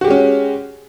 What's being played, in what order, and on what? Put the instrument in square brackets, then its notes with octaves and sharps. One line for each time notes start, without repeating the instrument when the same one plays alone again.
[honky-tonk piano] F#4
G4
G#3
C#4